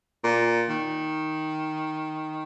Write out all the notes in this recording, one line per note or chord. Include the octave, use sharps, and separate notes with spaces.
A#2
D#3